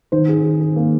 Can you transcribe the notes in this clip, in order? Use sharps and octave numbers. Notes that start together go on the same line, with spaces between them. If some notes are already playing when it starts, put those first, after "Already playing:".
D#3 C5
G#4
G#4
G#4
A#3